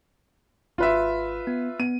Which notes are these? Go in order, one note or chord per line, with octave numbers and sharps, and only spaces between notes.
G#1 F4 B4 E5
B3
B3 D#7